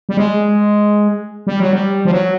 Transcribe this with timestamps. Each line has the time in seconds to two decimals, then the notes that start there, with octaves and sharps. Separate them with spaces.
0.09 G3
0.17 G#3
1.47 G3
1.60 F#3
1.73 G3
2.05 F3
2.12 F#3